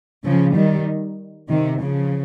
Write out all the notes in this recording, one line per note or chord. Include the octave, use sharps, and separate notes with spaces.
C#3 F3
D#3 G3
C3 D#3
C#3 F3